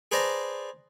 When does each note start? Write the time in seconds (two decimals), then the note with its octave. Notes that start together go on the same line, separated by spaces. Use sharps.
0.12 G#4 B4 C5 D5 A5 A#5